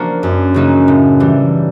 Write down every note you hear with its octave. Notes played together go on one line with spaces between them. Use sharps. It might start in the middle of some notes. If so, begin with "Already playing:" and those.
Already playing: F3 A#3 D4 F#4
F#2
C#3 F#3 A#3 D#4
A2
E3 G3